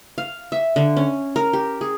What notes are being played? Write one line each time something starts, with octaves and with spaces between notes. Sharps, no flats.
F5
E5
D3
C#4
A#4
G4
G#4